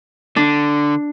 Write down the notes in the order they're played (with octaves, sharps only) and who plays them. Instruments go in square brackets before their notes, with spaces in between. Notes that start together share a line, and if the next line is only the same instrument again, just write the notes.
[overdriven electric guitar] D3 [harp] D4